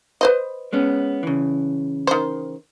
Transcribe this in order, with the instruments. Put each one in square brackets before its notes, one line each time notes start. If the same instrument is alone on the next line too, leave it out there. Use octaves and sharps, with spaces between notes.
[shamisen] B4 C5 D#5
[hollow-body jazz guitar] G#3 B3 C#4
C#3 E3
[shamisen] D#3 C5